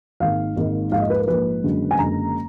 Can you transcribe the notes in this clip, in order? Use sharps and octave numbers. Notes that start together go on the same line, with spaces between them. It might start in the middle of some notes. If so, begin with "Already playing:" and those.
G#1 G#2 D#3 A#3 F5
G#1 G#2 D#3 A#3
A#1 G#2 F3 A#3 F5
D#5
B4
A#4
A#1 G#2 F3 A#3 B4
F#1 F#2 D3 G#3
G#5
F#1 F#2 D3 G#3 A#5